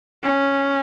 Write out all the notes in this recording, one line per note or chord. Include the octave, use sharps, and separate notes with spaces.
C#4